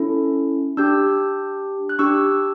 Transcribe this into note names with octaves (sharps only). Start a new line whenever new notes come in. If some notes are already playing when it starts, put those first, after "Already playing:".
Already playing: C#4 E4 A4
D4 G4 E6 G6
F#6
D4 G4 C#6 E6